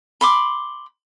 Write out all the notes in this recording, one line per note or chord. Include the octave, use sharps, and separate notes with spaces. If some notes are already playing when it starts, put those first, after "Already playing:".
B5 C6 D6